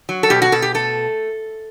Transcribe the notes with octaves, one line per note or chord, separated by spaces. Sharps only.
F#3
A4
B2 G4
F#4
B2 A4
G4
A3 A4